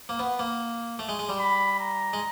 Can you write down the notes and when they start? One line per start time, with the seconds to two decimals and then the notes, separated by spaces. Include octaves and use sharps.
0.09 A#3
0.19 B3
0.39 A#3
0.99 A3
1.09 G#3
1.19 G#3
1.29 G3
1.39 B5
1.80 A#5
2.13 G#3